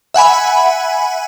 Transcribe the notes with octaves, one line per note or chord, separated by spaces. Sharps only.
E5 F#5 G#5 B5